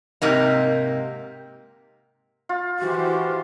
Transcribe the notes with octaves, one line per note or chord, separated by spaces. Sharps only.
G#2 C3 A#3 D#4
F4
E3 F#4 G4 C5